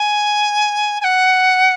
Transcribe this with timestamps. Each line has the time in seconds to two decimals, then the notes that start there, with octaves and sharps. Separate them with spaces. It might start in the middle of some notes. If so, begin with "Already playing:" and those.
Already playing: G#5
1.00 G#5
1.04 F#5